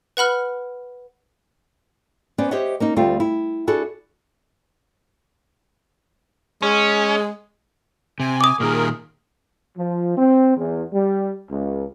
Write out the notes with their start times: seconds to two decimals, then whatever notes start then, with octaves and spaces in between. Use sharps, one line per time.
0.17 B4 F#5 B5 F6
2.38 B3 C#4 C5 D5
2.51 G4 C5 C#5 D#5 E5 F#5
2.80 A#3 C#4 D#4
2.96 D2 G3 A3 C4 F4
3.20 E4
3.67 D4 E4 F#4 G#4 A4
6.62 G#3 C#4
8.20 C3 G#5
8.41 D6 D#6
8.60 A#2 D#3 G#4 A#4
9.77 F3
10.18 C4
10.57 E2
10.93 G3
11.51 C#2